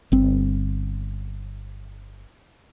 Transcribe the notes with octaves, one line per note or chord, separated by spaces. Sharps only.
G1 C4